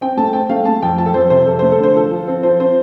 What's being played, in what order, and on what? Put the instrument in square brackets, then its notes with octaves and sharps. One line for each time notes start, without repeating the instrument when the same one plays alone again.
[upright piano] C4 G5
A3 A5
C4 G5
A3 F5
A3 A5
F2 G5
F3 A5
A4
F2 C5
C3 C5
F2 A4
A3 C5
A4
D3
C5
F3 A4
F3
C4
F3 C5
C4 C5